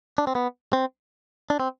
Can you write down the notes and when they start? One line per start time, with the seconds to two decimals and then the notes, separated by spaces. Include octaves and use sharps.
0.18 D4
0.27 C4
0.35 B3
0.73 C4
1.50 D4
1.60 C4